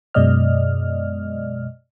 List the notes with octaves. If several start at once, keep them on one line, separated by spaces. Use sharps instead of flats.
F#2 B2 G#3 D5 D#5 F6